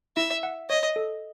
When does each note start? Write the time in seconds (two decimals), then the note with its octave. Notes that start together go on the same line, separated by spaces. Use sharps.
0.17 E4 E5
0.43 F#5
0.69 C#5 D#5
0.96 A4